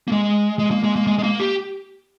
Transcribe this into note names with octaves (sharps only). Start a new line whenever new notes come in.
A#3
G#3
G#3
A#3
G#3
A#3
G#3
G#3
A#3
G4